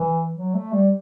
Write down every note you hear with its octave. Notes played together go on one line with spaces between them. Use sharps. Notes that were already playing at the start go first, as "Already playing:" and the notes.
Already playing: E3
F#3
A3
G3